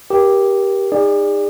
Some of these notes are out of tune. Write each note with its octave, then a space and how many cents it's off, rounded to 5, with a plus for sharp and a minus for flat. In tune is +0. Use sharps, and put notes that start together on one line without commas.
G4 +0 A#4 +30
D#4 -10 G#4 -40 D5 +0